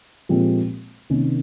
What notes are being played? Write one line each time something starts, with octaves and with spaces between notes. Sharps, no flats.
A#2 F3 G#3 C4 G4
C3 D#3 A#3 C#4